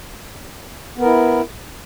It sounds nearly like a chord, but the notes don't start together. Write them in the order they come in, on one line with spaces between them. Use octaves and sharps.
B3 A#4 E4